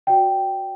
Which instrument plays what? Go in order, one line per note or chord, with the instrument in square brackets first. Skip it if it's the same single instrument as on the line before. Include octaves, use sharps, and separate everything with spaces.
[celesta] F#4 B4 D5 G5